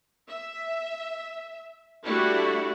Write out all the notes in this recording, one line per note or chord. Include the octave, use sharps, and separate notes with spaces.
E5
G3 A3 D4 E4 F#4